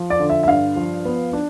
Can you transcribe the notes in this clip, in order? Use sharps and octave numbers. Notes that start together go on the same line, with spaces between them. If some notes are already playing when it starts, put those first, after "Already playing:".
Already playing: F3
D5
D3
E5
E5
G2 F5
F3
B3
D4